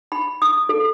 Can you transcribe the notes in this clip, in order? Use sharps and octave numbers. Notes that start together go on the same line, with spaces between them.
B5
D#6
A4